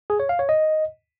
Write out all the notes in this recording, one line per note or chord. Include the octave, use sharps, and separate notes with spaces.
G#4
C#5
F5
C#5
D#5